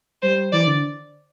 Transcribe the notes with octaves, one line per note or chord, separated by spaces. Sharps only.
G3 C5
E3 D5
D3